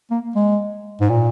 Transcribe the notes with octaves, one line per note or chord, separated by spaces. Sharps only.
A#3
G#3
G#2
A#2